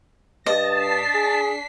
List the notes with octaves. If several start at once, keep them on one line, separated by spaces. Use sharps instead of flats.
G2 D#5 A5 A#6
D4 B6 C7
G#4